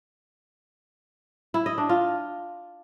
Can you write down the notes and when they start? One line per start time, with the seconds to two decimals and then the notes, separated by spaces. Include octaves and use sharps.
1.54 E4
1.66 D#5
1.78 D4
1.89 F4